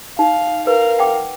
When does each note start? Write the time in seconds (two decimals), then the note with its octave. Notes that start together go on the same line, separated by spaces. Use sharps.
0.19 D#4 F5
0.67 A#4 B4 F5
0.99 F#5 G5 D6